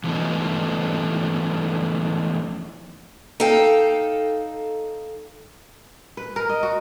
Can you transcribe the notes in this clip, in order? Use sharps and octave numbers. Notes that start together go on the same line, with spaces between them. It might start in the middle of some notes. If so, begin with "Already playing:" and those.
E3 F3 A3 B3 C#4 D#4
D#4 A4 F5 G5
B4
A#4
D#5
F#4